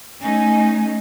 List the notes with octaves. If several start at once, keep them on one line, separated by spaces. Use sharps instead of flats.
A3 C#4 D#4 G#5